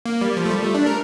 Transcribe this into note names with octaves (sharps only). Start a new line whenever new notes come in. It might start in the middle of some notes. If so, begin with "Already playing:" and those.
A#3
G3
F3
A3
G3
A3
D4
A#4